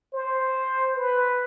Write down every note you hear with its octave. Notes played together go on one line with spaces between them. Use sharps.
C5
B4